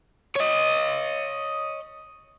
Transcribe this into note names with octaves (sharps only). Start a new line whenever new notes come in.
C#5 D#5